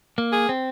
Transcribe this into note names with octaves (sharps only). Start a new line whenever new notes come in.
A#3
G#4
C4